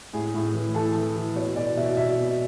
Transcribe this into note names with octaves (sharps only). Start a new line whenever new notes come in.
A2 G#4
A2
E3
E3 A4
E3
E3
B2 C#5
B2 D5
B2 E5
B2 E5
B2